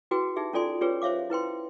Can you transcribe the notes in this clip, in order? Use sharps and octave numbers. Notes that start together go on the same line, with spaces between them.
E4 F#4 G#4 B4 G5
D#4 G4 G#4 E5
C#4 F4 A4 D5 G#5 C6
C#4 F4 G4 G#4 B4 C#5
C5 C#5 E5 F5 D6
E4 B4 G5 C6